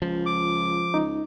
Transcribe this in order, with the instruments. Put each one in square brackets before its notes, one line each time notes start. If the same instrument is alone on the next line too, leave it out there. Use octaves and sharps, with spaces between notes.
[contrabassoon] C#2 [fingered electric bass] F3
[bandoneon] D6
[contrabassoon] C#2 [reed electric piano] D#4